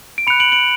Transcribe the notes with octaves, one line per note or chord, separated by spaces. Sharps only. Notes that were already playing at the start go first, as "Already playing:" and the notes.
D7
B5 F#6 C#7 F7
D7 F#7
D7 F#7